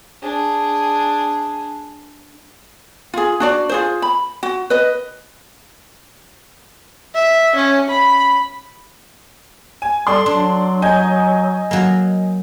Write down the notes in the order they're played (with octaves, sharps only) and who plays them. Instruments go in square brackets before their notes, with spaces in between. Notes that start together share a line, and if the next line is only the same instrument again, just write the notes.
[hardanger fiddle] D4 G#4
[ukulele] F4 G#4
D4 F#4 D5
F4 G#4 C5
B5
F#4
B4 D#5
[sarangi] E5
C#4
B5
[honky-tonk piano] G#5
[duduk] G3 [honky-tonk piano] A4 D5 C6
[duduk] F#3 [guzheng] D4
[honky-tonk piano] D#5 G#5 G6
[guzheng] F#3 A#3